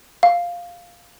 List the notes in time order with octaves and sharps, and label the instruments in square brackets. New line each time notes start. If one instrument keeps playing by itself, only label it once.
[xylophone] F5